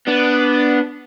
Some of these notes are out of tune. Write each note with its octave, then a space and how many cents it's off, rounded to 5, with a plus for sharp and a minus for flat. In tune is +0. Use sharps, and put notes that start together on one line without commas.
B3 +0 D4 +0